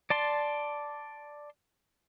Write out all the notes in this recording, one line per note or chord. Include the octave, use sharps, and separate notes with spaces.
D5 A5 C6